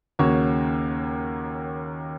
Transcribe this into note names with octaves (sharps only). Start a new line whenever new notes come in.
D#2 C#3 A#3 F#4 C#5